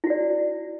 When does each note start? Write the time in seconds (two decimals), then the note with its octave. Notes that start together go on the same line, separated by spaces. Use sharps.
0.04 E4
0.07 F#4
0.10 D5